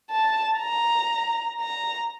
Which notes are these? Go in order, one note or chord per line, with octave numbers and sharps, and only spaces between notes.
A5
A#5
A#5